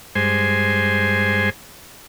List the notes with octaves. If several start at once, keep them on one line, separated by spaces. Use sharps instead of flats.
G2 G#3 C5 G#5